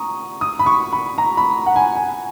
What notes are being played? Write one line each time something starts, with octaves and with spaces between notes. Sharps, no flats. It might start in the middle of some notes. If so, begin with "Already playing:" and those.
Already playing: A#5 C#6 D#6
D#6
B5
C#6
B5
A#5
B5
F#5
G#5
G#5